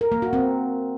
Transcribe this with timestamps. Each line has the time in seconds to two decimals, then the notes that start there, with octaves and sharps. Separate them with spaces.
0.01 A#4
0.12 A#3
0.22 F#4
0.33 C4